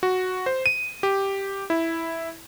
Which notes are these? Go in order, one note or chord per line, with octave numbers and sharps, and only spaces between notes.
F#4
C5
D#7
G4
E4